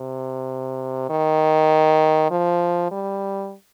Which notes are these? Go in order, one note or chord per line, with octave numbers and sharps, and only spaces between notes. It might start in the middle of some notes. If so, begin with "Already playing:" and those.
Already playing: C3
D#3
F3
G3